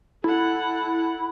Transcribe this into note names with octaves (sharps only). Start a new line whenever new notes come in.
E4 A4 F#5